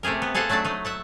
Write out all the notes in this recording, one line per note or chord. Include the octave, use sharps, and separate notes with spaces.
C3 A3 G4 G#4 A#4
B3
G#4 A4 C5 F5 F#5
F#3 A3 D4 D5 A5
A3 D#4
E5 F#5 A5